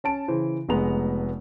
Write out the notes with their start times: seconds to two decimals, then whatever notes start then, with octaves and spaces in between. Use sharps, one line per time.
0.04 C#4 A5 D7
0.28 C#3 E3 C5
0.69 F1 G#3 A3 B3 A#5 F7